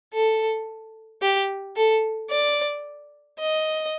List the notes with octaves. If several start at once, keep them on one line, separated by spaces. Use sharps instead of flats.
A4
G4
A4
D5
D#5